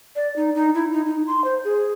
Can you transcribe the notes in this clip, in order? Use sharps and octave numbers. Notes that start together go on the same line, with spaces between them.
D5
D#4
D#4
E4
D#4
D#4
C6
C5
G#4